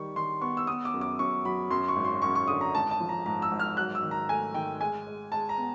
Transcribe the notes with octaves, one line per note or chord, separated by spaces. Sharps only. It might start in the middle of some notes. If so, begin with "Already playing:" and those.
Already playing: D#3 G3 C#6
D#3 C6
B3 C#6
E6
B3 D#6
D6
F#2
D6
F#2 C#6
F#3 B5
F#2 C6
C#6
G#1
C6
F#2 C#6
C#6
D3 D#6
A#5
G#1 A5
A5
F3
A#5
G#2 A#5
E6
G#1
F6
F#3 F#6
E6
D#3
A#5
A3 G#5
D#3 G5
G#3 G#5
G#3
G#3 A5
A#5
B3